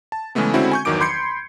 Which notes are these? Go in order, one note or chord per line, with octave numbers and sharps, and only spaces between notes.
A5
C#3 E3 G#3 A3 B3
D3 G#3 C4 C#4 E4 F#4
G#5 C#6 G6
G1 E2 D#3 F#3 D6 D7
B5 C6 G6 G#6 C7 C#7